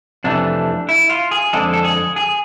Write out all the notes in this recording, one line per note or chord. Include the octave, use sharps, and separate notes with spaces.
F2 C3 E3 A3 D4
E4
F4
G#4
F2 D3 G#3 A4
A4
G#4
G#4